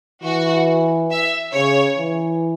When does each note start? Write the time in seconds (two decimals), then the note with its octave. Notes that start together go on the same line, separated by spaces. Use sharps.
0.23 E3 F#4
1.11 E5
1.53 C#3 C#5
1.98 E3